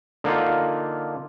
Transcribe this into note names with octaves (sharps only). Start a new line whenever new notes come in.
D3 A#3 D#4 F4